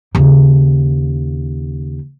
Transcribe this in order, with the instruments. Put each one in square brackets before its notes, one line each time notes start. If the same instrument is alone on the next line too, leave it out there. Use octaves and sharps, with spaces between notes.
[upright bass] D#2 C#3